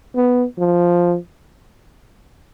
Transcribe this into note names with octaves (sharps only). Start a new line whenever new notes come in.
B3
F3